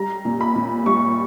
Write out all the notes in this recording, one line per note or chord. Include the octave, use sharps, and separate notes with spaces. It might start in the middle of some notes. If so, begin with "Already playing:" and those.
Already playing: G3 A#5
A#2
B5
A#2
G3 C#6